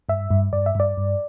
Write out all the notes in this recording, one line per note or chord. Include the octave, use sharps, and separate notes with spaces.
G2 E5
G2
G2 D5
E5
G2 D5
G2